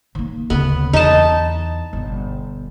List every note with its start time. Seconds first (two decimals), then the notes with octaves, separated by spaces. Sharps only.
0.15 D#3 A#3
0.50 D2 C#3 B3
0.93 E2 D#4 A5
1.93 G1 B2